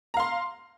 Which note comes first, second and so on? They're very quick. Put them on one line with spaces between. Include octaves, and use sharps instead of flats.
A#5 F5 C6